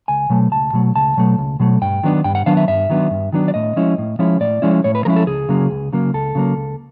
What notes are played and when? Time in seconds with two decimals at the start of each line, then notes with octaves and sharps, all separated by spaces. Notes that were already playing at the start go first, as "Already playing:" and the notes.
0.08 C#2 G#5
0.30 B2 F#3 A3
0.52 C#2 A5
0.73 B2 F#3 A3
0.96 C#2 A5
1.17 B2 F#3 A3
1.38 C#2
1.60 B2 F#3 A3
1.81 G2 G5
2.03 D#3 F#3 B3 D4
2.24 G2 G5
2.35 F#5
2.46 D#3 F#3 B3 D4 F5
2.57 E5
2.68 G2 E5
2.90 D#3 F#3 B3 D4
3.11 G2
3.33 D#3 F#3 B3 D4
3.48 D5
3.54 A2 D#5
3.76 F3 G#3 C#4 E4
3.98 A2
4.19 F3 G#3 C#4 E4
4.41 A2 D5
4.62 F3 G#3 C#4 E4
4.84 A2 C#5
4.95 B4
5.05 F3 G#3 C#4 E4 A#4
5.16 A4
5.27 C#2 G#4
5.49 C#3 F#3 A#3
5.71 C#2
5.93 C#3 F#3 A#3
6.14 C#2 A4
6.35 C#3 F#3 A#3
6.57 C#2